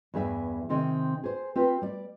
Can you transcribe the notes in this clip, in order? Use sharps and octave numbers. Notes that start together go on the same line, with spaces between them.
E2 G2 G#4 E5
C3 D#3 C4 G#4
G#4 C5
C4 F4 G4 B4
G3 D5